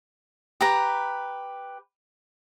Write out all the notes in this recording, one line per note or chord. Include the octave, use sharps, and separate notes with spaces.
G4 B4 A#5